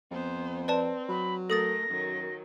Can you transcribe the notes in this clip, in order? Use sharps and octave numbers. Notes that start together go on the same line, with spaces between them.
F2 B3 C5
C4 B4 D5 A5
F#3 B5
A3 A4 A#4 D#6 A6 A#6
F#2 D#3 F#3